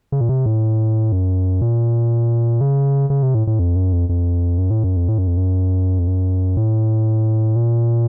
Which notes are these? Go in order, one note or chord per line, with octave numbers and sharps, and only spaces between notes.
C#3
A#2
C3
A2
F#2
A#2
C#3
C#3
C3
A2
A2
F2
F#2
F2
F2
F#2
A2
F#2
F2
A2
F#2
F2
F#2
F2
F#2
A2
A#2